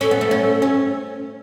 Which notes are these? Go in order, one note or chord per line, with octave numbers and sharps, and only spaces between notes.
C#4 A4
B3
A3
C#4
C#4